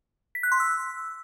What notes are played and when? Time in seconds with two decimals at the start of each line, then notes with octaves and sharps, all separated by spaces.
0.35 B6
0.43 F#6
0.52 C6
0.60 E6